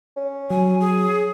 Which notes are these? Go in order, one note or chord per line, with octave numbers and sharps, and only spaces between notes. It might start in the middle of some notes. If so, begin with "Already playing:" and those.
C#4
F#3 G#5
G#4